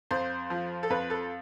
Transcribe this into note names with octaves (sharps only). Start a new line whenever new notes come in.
F2 C5
F3
A4
F2 B4
A4